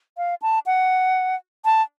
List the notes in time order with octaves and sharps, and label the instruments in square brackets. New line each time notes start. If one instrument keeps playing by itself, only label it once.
[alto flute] F5
A5
F#5
A5